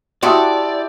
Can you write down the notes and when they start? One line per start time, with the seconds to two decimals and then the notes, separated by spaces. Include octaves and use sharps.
0.23 E4 F#4 G4 D5 E5 A5 C6 D#6